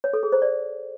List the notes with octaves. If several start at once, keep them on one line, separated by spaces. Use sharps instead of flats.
C#5
A4
G#4
C5
D5